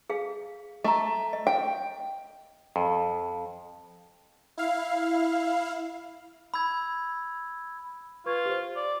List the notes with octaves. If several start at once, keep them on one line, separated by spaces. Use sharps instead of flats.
G#4 F5
A3 D#5 A#5
D#5
G5
F2
E4 F5
B5 E6 G#6
F4 B4 C#6 G#6
G4 C5
D5